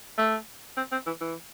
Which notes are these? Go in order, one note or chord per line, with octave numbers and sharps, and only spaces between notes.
A3
C4
C4
E3
E3